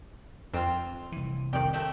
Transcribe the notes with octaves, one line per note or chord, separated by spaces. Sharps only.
F2 C4 F4
C2 E3
F2 D#3 G4 D5
A3 C4 G4